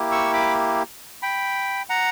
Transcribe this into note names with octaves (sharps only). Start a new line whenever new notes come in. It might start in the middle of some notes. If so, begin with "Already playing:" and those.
Already playing: A#3 E4 G4
C#6 E6
B5 D6
G5 B5
F#5 A#5